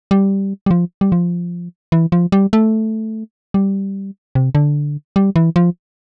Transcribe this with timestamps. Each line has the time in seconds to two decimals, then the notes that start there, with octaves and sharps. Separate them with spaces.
0.11 G3
0.66 G3
0.71 F3
1.01 G3
1.12 F3
1.92 E3
2.12 F3
2.32 G3
2.53 A3
3.54 G3
4.35 C3
4.55 D3
5.16 G3
5.36 E3
5.56 F3